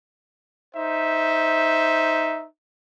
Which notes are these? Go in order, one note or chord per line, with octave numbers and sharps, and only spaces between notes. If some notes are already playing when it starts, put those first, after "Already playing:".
D#4 C5 E5